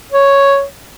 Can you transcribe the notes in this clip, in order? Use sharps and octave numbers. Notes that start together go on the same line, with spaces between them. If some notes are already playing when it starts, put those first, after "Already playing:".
C#5